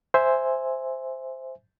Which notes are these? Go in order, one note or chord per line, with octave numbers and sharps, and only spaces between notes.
C5 E5 G#5